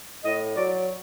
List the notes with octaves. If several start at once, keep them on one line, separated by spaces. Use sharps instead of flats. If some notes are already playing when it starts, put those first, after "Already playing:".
A2 D#5
F#3 D5